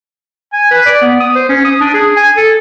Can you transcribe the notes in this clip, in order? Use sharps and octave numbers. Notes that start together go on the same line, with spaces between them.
G#5
B4
D5
B3
D#6
C5
C#4
D#6
D4
G#4
G#5
A4